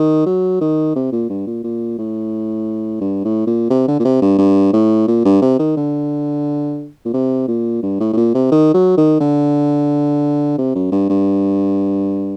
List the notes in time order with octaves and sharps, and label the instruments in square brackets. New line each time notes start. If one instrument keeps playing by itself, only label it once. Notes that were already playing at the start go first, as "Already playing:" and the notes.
Already playing: [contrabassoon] D#3
F#3
D#3
C3
A#2
G2
A#2
A#2
A2
G2
A2
A#2
C3
D3
A#2
C3
G2
G2
A2
A#2
G2
C3
D#3
D3
A#2
C3
A#2
G2
A2
A2
A#2
C3
D#3
F#3
D#3
D3
C3
F#2
G2
G2